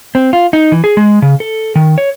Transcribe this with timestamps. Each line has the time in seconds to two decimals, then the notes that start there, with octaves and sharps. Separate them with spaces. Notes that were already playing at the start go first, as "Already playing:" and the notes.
0.15 C4
0.33 F4
0.53 D#4
0.72 E3
0.84 G#4
0.97 G#3
1.22 C#3
1.40 A4
1.76 D#3
1.98 C#5